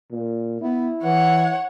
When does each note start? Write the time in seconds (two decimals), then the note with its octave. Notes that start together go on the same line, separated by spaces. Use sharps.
0.11 A#2
0.62 B3 E4
1.03 E3 C#5 F#5